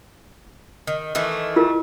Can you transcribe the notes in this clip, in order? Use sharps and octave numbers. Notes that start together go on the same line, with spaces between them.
D#3
D#3 E3 A3
E4 F4 A#4